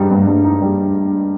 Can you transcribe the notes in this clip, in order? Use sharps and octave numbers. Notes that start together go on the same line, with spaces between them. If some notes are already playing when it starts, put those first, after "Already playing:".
Already playing: G2 G3 D#4
G2
G2
D#4
G3